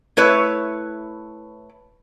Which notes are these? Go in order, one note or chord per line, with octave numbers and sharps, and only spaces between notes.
A3 E4 B4 C#5